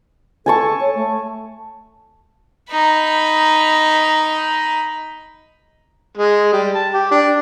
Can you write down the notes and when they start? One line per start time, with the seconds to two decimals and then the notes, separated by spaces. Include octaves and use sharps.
0.46 A4 G#5 A5 C#6
0.81 C#5
0.95 A3
2.71 D#4 B5
6.17 G#3
6.52 G3
6.75 A5
6.94 G4
7.11 D4